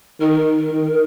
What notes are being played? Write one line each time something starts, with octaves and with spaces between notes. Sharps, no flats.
D#3 A#4
D#3